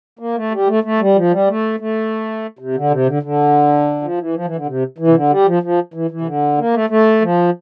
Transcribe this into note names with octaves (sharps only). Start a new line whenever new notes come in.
A#3
A3
G3
A3
A3
G3
F3
G3
A3
A3
C3
D3
C3
D3
D3
F3
E3
F3
E3
D3
C3
E3
C3
D3
G3
F3
F3
E3
E3
C3
D3
A#3
A3
A3
F3